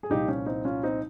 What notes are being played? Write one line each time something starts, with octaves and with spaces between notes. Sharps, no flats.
G#4
C2 A#2 F3 D#4 G4
C#4
C4 D#4
C#4 F4
C4 D#4